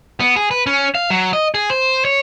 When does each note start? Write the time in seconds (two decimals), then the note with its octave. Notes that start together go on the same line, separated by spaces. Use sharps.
0.20 B3
0.36 G#4
0.51 B4
0.66 C#4
0.95 F5
1.10 F#3
1.33 D#5
1.54 G#4
1.70 C5
2.05 C#5